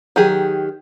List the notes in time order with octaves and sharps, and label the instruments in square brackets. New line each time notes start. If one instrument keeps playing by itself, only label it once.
[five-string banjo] D#3 F#3 G4 G#4